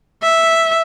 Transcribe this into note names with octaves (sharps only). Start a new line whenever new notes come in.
E5